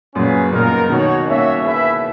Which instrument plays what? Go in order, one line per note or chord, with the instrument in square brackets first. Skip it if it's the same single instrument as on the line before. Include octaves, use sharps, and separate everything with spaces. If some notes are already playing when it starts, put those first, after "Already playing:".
[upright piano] F#2 A#2 [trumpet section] C#4 G#4 B4
[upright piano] A#2 C#3 [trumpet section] B3 D#4 A#4
[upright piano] B2 D#3 [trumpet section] D#4 F#4 C#5
[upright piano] A#3 C#4 [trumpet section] F#4 C#5 E5
[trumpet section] E4 G#4 B4 E5